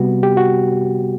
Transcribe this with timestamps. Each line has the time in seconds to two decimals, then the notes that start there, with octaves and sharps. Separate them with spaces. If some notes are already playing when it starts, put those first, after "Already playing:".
Already playing: C3 G3 B3 F#4
0.23 G4
0.37 F#4